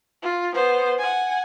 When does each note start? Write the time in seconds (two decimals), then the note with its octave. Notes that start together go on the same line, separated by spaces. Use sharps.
0.22 F4
0.54 B3 C5
0.98 F#5 G#5